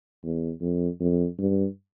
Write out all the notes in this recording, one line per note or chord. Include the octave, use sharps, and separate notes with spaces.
E2
F2
F2
G2